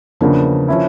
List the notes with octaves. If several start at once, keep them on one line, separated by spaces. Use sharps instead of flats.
E2 C#3 F3 A#3 D4
F3 C#4 E4